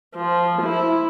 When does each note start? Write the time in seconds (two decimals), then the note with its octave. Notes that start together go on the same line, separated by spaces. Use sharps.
0.16 F3
0.62 E4